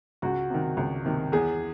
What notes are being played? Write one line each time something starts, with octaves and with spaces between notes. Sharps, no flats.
C#2 F#4
C3 D#3
C#2
C3 D#3
E2 G#4